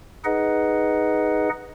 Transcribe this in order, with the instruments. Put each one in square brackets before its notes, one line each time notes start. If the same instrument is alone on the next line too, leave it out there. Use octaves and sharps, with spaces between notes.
[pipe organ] D#4 G#4 B4 D#5 F#5